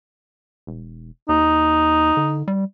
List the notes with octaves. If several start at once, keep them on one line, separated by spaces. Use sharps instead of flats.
E1
D#2 D#4
D3
G3